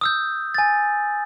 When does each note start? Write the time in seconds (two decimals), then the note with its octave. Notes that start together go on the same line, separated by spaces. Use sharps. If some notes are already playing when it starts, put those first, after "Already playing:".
0.01 D#6 E6 G6
0.54 G#5 A6